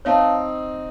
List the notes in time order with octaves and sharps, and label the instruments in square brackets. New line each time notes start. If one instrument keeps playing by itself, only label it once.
[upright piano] C4 D#4 [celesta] C#5 F5 A5